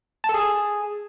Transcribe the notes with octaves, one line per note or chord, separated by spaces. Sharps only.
A5
A4
G#4